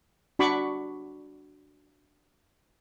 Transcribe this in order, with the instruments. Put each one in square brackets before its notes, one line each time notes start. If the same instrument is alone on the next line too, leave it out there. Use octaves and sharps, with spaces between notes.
[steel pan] D4 F#4 B5 C#6 D6